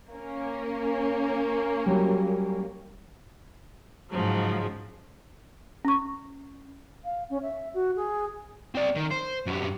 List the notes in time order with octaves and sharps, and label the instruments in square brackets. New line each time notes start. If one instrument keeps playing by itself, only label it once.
[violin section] A#3 C#4
[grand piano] F#3 G3
[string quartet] G#2 C#3 F3 F#3
[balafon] C#4 C#6
[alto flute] F5
C#4
E5
F#4
G#4
[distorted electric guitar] C4 D5
D#3
C5
F#2 G3